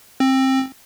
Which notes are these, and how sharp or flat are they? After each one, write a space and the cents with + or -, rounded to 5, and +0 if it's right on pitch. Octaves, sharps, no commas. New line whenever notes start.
C4 +20